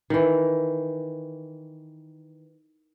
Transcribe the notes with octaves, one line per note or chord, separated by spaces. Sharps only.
D#3 E3